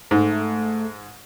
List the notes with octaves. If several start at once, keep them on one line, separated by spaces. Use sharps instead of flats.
G#2 A3